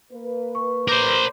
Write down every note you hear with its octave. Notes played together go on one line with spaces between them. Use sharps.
A#3 B4
C#6
A#4 C5 D6 G6